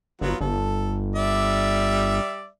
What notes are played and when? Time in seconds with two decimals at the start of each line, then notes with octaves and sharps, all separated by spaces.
0.21 G1 F#3 B3 F4
0.41 G1 A4
1.16 G3 D5 E5